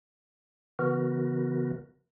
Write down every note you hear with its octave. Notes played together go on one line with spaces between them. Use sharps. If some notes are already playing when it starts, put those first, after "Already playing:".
C#3 E3 B3 F#4 A#4